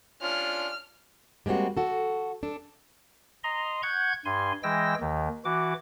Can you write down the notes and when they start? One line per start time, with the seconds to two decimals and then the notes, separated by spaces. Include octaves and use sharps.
0.22 C#4 D4 F4 F6
1.46 G3 G#3 A#3 C4 F#4
1.77 F#4 A4
2.43 D4 A4
3.44 D#5 A#5 C6
3.83 F#5 C#6 G6 G#6
4.25 G2 G#5 C6
4.63 E3 G#3 G5 E6 A#6
5.01 D#2 D#3
5.45 E3 F#4 D6